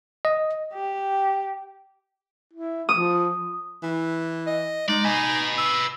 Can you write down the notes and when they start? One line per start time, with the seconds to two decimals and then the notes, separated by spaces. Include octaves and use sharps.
0.25 D#5
0.74 G4
2.53 E4
2.89 F3 D#6
3.83 E3
4.47 D#5
4.89 G#3 D#4 D5
5.05 B4 D#5 G#5
5.58 E6